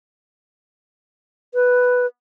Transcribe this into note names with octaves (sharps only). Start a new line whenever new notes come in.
B4